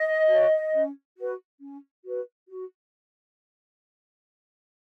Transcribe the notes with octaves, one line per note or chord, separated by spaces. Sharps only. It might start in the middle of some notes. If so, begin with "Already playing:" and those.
Already playing: D#5
F#4 C#5
C#4
F#4 B4
C#4
F#4 B4
F#4